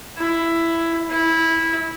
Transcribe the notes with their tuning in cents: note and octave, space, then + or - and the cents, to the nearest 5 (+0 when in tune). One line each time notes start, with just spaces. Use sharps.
E4 +10
E4 -15